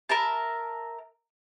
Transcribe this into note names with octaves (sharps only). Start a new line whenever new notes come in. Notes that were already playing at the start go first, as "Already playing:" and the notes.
A#4 E5 A5